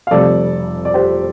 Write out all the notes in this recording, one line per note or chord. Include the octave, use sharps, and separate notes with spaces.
F5
F1 F2 C3 G3 A4 D5
D5
G4 C5